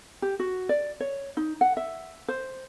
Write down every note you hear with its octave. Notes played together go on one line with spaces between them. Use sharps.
G4
F#4
D5
C#5
D#4
F#5
E5
C5